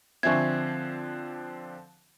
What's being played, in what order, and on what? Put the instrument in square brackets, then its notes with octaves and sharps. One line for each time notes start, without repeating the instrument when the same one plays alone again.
[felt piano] D3 F3 C4 [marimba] E5 G#5 C#6 [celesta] G#6